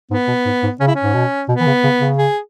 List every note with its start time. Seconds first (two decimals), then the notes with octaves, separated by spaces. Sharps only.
0.11 G#2 B3
0.28 B2
0.46 G#2
0.63 G#2
0.80 C#3 C#4
0.88 E4
0.95 C#4
1.03 G#2
1.14 B2
1.49 B2 B3
1.60 E3
1.66 C#3
1.84 C#3
2.00 C#3
2.18 G#4